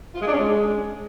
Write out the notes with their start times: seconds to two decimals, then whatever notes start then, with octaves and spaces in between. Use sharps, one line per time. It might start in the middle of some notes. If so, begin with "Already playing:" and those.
0.14 F4
0.20 G#3
0.27 D4
0.33 C#4
0.39 G#3